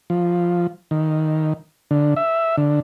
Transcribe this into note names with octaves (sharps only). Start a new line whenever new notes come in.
F3
D#3
D3
E5
D3